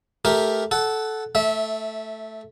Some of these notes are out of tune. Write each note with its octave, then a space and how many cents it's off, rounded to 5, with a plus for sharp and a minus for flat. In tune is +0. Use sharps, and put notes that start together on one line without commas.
A3 -10 G4 +0 A#4 +0
A4 -10 F#5 +10
A3 +0 E5 -20